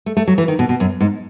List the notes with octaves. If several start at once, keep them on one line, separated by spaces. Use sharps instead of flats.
A3
A3
F#3
E3
D#3
B2
B2
F#2
G#2